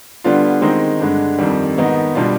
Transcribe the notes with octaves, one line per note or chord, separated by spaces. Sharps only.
D3 G3 B3 D4 F4
D#3 G#3 C4 D#4
G2 D3 G#3
F2 D#3 G3
G#2 D#3 B3 D#4
B2 G3 D4 F4